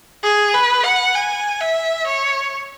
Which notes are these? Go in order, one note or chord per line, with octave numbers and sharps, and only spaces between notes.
G#4
B4
F#5
G#5
E5
C#5